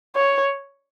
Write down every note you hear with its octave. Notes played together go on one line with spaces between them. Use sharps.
C#5